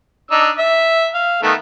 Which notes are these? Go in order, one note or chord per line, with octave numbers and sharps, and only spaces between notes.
D4 D#4 E6
E5
F5
D#3 A3 B3